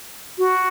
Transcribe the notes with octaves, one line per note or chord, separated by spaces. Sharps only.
F#4